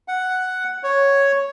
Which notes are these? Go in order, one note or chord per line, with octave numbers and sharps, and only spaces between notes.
F#5
C#5